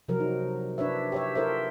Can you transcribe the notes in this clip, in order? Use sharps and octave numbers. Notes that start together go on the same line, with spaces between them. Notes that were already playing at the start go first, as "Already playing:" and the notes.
C3 F3 F#3 A#4
D#4
D4 B4 C#5 E5
G4 C#5 E5
F4 A4 A#4 C5 E5